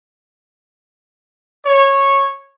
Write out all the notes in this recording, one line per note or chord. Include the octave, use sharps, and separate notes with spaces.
C#5